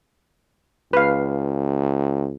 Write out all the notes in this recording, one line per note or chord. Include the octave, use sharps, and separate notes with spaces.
C#2 B4 F5